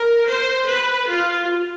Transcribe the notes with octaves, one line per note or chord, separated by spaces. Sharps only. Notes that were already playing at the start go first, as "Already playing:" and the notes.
Already playing: A#4
C5
B4
F4